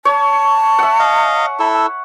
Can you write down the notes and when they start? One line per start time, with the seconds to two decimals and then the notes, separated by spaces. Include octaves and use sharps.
0.05 C#5 A5
0.79 E5 F#5
0.99 D#5 F5
1.60 E4 A4